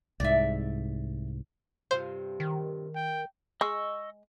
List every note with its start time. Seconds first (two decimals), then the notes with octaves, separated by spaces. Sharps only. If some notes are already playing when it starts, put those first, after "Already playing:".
0.20 C2 G#2 D5 E5
1.91 G2 C3 F4 C5
2.40 D#3
2.95 G5
3.61 G#3 D#5 C#6 E6